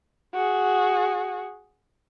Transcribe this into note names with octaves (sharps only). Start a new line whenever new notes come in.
F#4 G#4